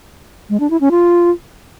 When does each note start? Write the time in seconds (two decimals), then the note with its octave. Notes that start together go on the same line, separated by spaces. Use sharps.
0.50 G#3
0.60 D4
0.70 E4
0.81 C#4
0.91 F4